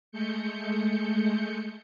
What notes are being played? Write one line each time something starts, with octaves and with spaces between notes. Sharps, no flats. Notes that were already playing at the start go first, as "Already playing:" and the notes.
G#3 A3 G6 C#7